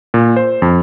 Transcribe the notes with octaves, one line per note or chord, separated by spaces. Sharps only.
A#2
C5
F2